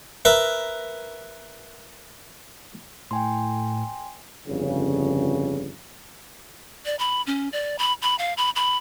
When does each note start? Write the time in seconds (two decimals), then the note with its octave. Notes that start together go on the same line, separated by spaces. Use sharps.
0.25 A#4 B4 E5
3.11 A2 G5 G#5 C6
4.47 G1 F2 C#3
6.86 D5
6.99 B5
7.27 C#4
7.52 D5
7.79 B5
8.02 B5
8.19 F5
8.37 B5
8.56 B5